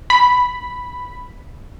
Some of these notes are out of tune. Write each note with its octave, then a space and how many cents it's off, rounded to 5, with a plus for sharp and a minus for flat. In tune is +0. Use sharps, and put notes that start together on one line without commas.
B5 +5